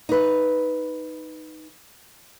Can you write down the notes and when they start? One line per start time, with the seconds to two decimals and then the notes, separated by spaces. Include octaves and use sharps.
0.09 D#4 B4